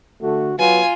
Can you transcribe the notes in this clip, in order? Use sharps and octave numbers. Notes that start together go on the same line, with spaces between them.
D3 A3 F#4
F#3 B3 F4 G#5